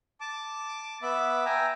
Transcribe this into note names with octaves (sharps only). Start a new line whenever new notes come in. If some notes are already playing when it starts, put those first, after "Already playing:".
A5 D6
B3 E5 B5 D6
E5 G5 G#5 A#5